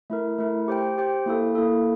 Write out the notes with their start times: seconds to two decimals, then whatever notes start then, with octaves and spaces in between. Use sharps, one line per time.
0.10 A3 E4 A#4
0.39 A3 E4 A#4
0.68 G4 C5 G5
0.98 G4 C5 G5
1.26 A#3 E4 A4
1.55 A#3 E4 A4